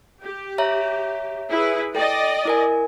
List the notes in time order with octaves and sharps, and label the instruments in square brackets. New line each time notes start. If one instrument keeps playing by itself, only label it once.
[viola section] G4
[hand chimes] C#5 E5 A#5
[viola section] E4 G#4 B4
[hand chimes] A4 G5 [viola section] D5 D#5
[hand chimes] E4 A#4 G#5